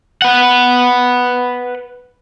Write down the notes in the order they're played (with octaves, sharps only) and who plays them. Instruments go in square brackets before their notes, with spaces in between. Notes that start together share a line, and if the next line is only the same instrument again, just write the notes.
[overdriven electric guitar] B4 F#5